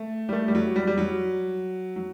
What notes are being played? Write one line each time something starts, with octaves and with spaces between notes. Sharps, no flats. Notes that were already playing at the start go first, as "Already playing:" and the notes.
Already playing: A3
G3
A3
G3
F#3
G3
G3
F#3
F#3